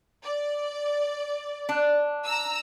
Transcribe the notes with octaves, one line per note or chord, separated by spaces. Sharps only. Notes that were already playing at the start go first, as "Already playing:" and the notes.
D5
D4
A#5 E6